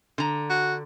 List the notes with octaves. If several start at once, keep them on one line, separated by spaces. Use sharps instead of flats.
D3 A#5
F#4